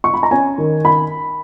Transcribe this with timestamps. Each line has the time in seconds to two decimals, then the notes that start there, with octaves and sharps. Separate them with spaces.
0.04 C#6
0.14 B5
0.23 A#5
0.31 C#4 G#5
0.58 D#3
0.85 B5